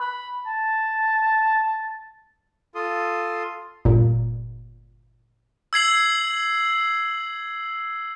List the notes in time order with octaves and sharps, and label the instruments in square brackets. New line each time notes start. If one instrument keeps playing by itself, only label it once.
[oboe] B5
A5
[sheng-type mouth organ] F4 A4 C6 D#6
[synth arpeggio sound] G1 A#2
[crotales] E6 G#6 C7 F#7